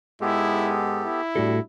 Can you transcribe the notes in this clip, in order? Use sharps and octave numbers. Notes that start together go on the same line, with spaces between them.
G#2 G#3 B3 E4 G4 A4
E4
A2 G3 D4 F#4 A4